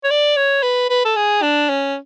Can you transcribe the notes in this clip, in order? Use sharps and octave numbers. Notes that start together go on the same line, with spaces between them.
C#5
D5
C#5
B4
B4
A4
G#4
D4
C#4